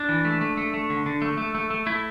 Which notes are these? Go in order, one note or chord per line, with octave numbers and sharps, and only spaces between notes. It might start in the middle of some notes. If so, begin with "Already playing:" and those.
Already playing: D4
E3
A3
A3
A3
A3
D3
D3
A3
A3
A3
A3
A3 E4